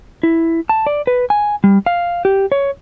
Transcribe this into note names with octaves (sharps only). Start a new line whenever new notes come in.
E4
A5
D5
B4
G#5
G3
F5
G4
C#5